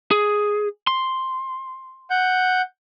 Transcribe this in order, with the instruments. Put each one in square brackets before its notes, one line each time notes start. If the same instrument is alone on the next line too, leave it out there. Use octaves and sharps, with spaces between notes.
[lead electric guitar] G#4
C6
[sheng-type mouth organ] F#5 G6